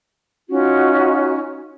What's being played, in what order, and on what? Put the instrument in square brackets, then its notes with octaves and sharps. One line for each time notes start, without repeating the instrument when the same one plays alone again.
[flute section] C#4 D#4 F4 F#4